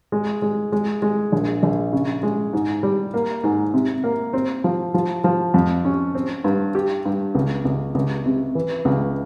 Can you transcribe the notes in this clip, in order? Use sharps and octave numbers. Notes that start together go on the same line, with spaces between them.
G#3
G#3
G#3
G#3
A#1
A#1
C#3
G#3
G#2
G3
A#3
G#2
C3
A#3
C4
F3
F3
F3
F2
C#4
C4
G2
G4
G2
C#2
C#2
C#2
C3
E3
C#2